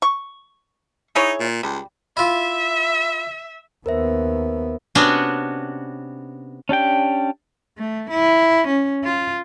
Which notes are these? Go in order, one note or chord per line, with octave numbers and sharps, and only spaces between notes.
C#6
D#4 E4 G#4 C#5
A#2
C#2 G3
E4 F4 E5
D#2 B3 A#4 C5 E5
C3 B3 C#4 D4 F#4
C#4 D4 G4 G5
A3
E4
C#4
F4